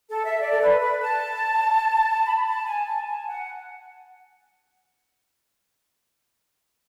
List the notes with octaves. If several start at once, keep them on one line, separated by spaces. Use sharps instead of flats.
A4
E5
D5
A4
B4
B4
A5
B5
A5
G#5
A5
G#5
F#5